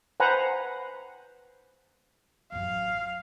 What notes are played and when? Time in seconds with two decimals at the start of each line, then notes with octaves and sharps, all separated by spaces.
0.20 B4 C5 F#5 G#5 A#5
2.52 A1 F#2 F5